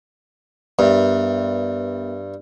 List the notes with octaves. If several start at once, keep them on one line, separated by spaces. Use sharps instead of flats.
G2 B3 A#4 E5